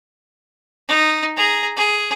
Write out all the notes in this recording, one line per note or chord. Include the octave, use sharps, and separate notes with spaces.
D#4
G#4 A#5
G#4